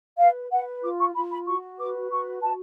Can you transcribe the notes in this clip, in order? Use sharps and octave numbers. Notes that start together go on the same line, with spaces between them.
B4 F5
B4 F#5
F4 D6
C#6
F4 B5
B5
F#4 C#6
B4 D6
F#4 C#6
F#4 A5